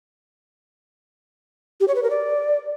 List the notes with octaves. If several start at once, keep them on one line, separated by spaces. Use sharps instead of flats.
G4
C#5
B4
A#4
D5